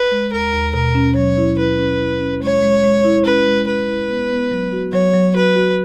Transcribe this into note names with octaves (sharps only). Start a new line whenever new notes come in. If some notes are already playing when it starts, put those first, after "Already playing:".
Already playing: B4
G#3
D#2 A#4
D#2
B2 A#4
C#4
F#3 C#5
E4
E4 B4
C#4
E4
C#4
G#3 C#5
G#3
G#3
E4
C#4 B4
G#3
C#4 B4
E4
B3
B3
F#3
F#4
F#3 C#5
F#3
F#4 B4
F#4